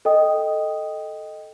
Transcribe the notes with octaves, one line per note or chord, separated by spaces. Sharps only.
A4 D#5 G5 D#6